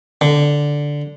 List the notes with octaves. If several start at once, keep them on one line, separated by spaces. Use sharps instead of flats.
D3